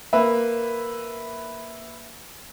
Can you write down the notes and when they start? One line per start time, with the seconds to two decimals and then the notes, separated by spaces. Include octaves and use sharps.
0.13 A#3 B4 E5